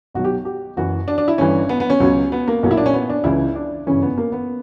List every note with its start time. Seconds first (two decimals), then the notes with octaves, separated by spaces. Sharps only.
0.14 B1 B2 F#3 F#4
0.24 G4
0.45 G4
0.77 F#1 F#2 E3 F#4
1.08 D4
1.18 D4
1.28 E4
1.38 G1 G2 E3 C#4
1.69 B3
1.80 B3
1.90 C#4
2.00 C#2 B2 F#3
2.32 B3
2.48 A#3
2.63 B1 A#2 F#3
2.71 E4
2.77 D4
2.86 C#4
2.94 B3
3.10 D4
3.24 C#2 C#3 E3 E4
3.56 D4
3.86 G1 F#2 C#3 E3 C#4
4.02 B3
4.18 A#3
4.32 B3